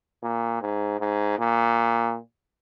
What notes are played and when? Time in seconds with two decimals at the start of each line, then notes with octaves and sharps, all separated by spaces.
0.23 A#2
0.61 G#2
1.00 G#2
1.38 A#2